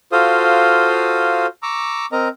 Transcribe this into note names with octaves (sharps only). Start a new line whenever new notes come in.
F4 F#4 A4 C5 F5 D#6
A#5 C#6 D6 E6
C4 A#4 D#5 A#5